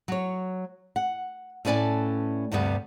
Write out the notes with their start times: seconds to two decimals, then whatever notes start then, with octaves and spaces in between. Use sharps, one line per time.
0.08 F#3 C#5
0.96 F#5
1.65 A2 C#4 B4 D5 G#5 A5
2.52 D2 G2 C3 G3 B3